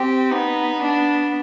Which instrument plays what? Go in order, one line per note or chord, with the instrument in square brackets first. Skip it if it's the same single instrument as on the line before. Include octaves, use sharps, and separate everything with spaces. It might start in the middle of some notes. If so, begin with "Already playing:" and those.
Already playing: [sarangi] C4 [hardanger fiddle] G4
[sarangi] B3 [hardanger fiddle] D#4
[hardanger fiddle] D4